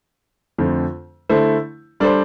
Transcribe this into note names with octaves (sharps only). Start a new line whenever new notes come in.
F2 D3 A3 C4
D3 A3 E4 A4 C5
G3 D4 A4 C5